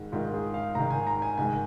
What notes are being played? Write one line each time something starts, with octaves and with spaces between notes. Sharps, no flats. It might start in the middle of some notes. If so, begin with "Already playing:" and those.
Already playing: G#2 D#3
G#2 D#3 F4
G#4
F5
G#2 D#3 A#5
G#5
A#5
G#5
G#2 D#3 G#5